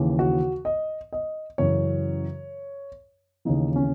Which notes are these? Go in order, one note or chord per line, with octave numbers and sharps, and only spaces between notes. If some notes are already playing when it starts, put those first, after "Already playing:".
Already playing: D#2 C#3 E3
F#4
D#5
D#5
F#2 C#3 E3 C#5
D#2 C#3 E3 D#4
C#4